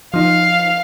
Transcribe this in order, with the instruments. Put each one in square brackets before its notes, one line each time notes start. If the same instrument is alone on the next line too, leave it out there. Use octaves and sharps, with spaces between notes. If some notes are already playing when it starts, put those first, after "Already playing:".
[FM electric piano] F3 D#4 [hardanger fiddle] F5